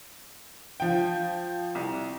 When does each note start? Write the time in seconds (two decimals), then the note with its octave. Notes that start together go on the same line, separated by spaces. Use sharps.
0.80 F3 G5
1.75 C2